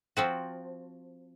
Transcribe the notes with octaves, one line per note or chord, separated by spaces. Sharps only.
F3 C4 F#4